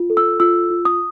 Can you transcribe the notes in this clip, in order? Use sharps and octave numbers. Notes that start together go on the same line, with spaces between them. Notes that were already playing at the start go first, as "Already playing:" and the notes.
Already playing: F4
A4
E6
F4 E6
F4
D#6